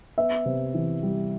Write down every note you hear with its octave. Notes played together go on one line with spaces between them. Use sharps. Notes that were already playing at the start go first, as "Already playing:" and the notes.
B3 E5
C3
E3
G3